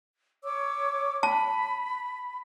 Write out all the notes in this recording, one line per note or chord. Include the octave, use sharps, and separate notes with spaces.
C#5 D6 E6
A5 B5